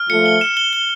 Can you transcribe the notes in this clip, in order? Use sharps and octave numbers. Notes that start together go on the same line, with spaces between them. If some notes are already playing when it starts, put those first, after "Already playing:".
Already playing: F6
F3 A3 C#7
G7
E7
G7
G7